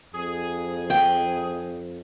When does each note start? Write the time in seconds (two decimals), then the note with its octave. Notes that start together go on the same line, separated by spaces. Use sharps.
0.14 F2 G#4
0.90 G5